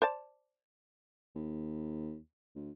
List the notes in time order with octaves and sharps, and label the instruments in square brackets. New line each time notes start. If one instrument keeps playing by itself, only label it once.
[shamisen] C5 D5 A5
[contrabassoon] D#2
D2